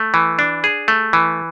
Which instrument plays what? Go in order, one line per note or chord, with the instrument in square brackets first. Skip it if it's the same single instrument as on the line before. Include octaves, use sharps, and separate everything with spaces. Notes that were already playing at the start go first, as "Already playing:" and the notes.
Already playing: [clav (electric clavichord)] A3
E3
D4
G#4
A3
E3